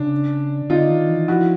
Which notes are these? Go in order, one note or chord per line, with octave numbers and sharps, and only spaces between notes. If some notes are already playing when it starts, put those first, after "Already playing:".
Already playing: C#3 D4
D3 D#4 F4
D#3
E3
F3 E4 F#4